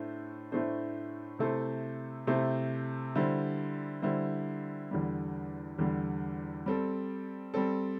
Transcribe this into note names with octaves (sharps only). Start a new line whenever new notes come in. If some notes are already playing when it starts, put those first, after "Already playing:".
Already playing: A2 A3 D4 C5
A2 A3 D4 C5
C3 A3 E4 A4 C5
C3 A3 E4 A4 C5
D3 G3 E4 C5
D3 G3 E4 C5
E2 D3 G3
E2 D3 G3
G3 C4 A4
G3 C4 A4